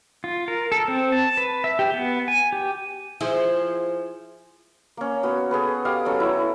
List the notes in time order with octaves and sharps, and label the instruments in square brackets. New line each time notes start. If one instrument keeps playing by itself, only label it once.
[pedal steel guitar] F4
A#4
A4
C4
A5
B4
E5
G4
B3
G#5
G4
[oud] F3 [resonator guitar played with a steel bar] E4 G#4 C5
[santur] A#3 C#4
B3 F#4
G#4 A4 B4
G4 F5 D#6
F#3 C#4 A4 E6
E4 C#5